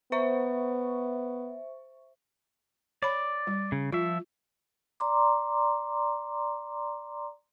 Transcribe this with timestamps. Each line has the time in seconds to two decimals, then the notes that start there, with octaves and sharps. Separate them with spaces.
0.12 B3 C5 E5 C#6
3.03 C#5 D5 B5
3.47 G3
3.72 C#3
3.93 F3 F4 E5
5.00 D5 A#5 C6 D6